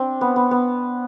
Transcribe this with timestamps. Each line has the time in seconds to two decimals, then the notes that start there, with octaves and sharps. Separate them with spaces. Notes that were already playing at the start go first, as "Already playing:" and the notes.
Already playing: C4 D4
0.21 B3
0.36 B3
0.51 B3